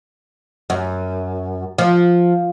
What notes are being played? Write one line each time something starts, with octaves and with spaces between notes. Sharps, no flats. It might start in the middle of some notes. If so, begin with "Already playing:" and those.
F#2
F3